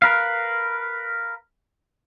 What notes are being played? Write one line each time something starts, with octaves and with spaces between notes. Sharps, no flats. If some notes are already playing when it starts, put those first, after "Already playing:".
A#4 B4 F5